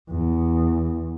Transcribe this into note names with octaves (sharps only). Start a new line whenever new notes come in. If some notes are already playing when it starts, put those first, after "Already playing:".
E2